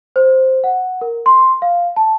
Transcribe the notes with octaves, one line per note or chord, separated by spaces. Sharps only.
C5
F#5
A#4
C6
F5
A5